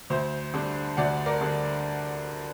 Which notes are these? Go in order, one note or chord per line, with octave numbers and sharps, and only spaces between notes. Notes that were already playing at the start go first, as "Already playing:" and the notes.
D2 C5
D3 G3 D4
D2 D5 F#5
A#4 D5
D3 G3 D4